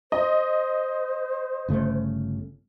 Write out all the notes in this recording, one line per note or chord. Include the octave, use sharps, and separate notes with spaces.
C5 D#5
G1 C#3 A3